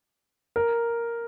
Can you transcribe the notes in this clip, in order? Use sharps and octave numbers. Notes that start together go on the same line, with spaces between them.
A#4